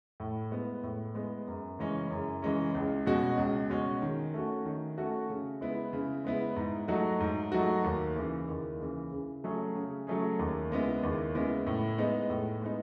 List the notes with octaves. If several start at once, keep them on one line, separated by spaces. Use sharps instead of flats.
A2
G#3 B3
A2
G#3 B3
F#2
C#3 E3 G#3 C#4
F#2
C#3 E3 G#3 C#4
C#2
B2 G#3 C#4 F#4
C#2
B2 G#3 C#4 F#4
D#3
A3 C#4 F#4
D#3
A3 C#4 F#4
C#3
G#3 B3 E4
C#3
G#3 B3 E4
G#2
F#3 A3 D#4 F#4
G#2
F#3 A3 D#4 F#4
D#2
C#3 E3
D#2
C#3 E3
C#3
F#3 A3 C#4 G#4
C#3
F#3 A3 C#4 G#4
D#2
C#3 G#3 B3 E4
D#2
C#3 G#3 B3 E4
A2
G#3 B3 D#4
A2
G#3 B3 D#4